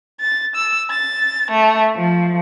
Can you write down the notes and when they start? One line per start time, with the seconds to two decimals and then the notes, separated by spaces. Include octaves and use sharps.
0.19 A6
0.55 E6
0.90 A6
1.51 A3
1.97 F3